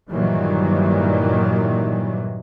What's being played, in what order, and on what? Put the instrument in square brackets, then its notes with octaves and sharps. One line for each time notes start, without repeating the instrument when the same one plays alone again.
[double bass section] G2 A#2 D#3 E3 F#3 G3